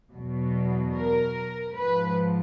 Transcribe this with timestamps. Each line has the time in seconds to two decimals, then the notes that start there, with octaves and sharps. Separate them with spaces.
0.13 E2 B2 F#3
0.94 A#4
1.75 G#2 F3 B4